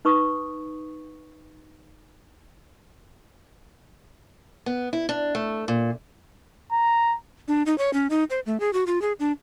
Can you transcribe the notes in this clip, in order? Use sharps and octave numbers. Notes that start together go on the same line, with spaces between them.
D#4 B4 C#6 D#6
B3
E4
D4
A3
A#2
A#5
D4
D#4
C#5
C#4
D#4
C5
A3
G#4
F#4
F4
G#4
D4